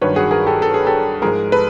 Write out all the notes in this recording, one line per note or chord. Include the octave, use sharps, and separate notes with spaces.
G2 D#3 F#3 B4 C#5
F#4 G#4
G#4 A#4
G4 A4
A4
G#4
G4 A4
G#2 F3 G#3 G#4 A#4
A4 B4